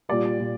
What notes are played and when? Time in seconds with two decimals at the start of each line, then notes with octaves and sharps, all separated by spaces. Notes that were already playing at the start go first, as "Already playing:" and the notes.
0.09 A#2 G3 D5
0.39 A#2